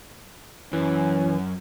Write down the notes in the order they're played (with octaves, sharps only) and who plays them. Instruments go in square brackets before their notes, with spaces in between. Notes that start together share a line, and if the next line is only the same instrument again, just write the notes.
[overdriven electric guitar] F#2 [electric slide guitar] E3 [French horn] C#4